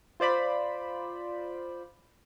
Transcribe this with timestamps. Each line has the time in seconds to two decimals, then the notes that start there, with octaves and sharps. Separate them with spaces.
0.20 F4 C5 D5 B5